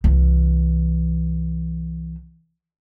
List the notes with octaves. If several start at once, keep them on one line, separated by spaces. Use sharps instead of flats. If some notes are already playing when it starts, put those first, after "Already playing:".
C2 E3